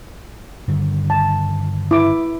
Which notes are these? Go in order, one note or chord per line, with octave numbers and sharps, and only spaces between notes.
G2 D3 D#3
A5
E4 D6